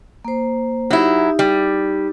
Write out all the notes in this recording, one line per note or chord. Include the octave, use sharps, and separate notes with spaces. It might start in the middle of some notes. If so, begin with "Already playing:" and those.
A#3 C5
F#3 D#4 E4 G4
G3